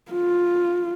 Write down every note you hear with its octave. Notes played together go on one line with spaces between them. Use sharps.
F4